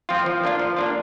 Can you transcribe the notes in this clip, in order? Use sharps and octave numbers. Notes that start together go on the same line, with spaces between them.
F3 C4 F4
F3
A#3 D4 F4
F3
A#3 D4 F4